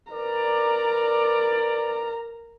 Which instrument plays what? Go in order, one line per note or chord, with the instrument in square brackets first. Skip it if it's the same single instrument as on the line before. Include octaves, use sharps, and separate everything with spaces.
[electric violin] A#4 A#5 [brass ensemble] B4 D5